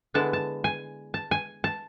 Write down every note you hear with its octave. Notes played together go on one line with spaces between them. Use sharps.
D3 G#3 B3 E4 A5
A5
G#5
A5
G#5
A5